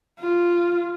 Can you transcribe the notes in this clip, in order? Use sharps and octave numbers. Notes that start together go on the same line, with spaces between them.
F4